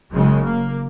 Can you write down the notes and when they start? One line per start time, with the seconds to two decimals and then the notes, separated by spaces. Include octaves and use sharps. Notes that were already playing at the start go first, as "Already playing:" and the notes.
0.13 F#1 F#2 C#3 G#3
0.46 A#3